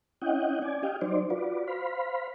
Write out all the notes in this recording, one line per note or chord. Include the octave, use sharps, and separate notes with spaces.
C#4 E4 D#5 F#5 G5
C#4 D5 G#5
G4 D#5 F5 G5
F#3 D#4 C5 D5
F4 F#4 B4 D5
C5 F5 B5